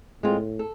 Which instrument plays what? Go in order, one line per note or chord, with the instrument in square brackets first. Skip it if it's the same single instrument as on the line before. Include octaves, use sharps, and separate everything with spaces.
[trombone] A2 [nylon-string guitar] G#3 C4 F4
[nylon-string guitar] A4